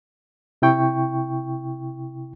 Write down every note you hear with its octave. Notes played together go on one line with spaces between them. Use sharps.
C3 E4 G5 C#6